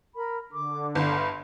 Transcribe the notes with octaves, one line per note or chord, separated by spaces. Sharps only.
A#4 B5
D3 D6
G1 F5 B5 C6